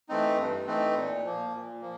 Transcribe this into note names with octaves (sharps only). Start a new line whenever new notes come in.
E3 A3 C4 D#4
G2
E3 A3 C4 D#4
A#2
F3 A#3
A#2
F3 A#3